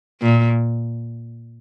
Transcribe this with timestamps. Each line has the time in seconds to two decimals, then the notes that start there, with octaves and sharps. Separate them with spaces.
0.22 A#2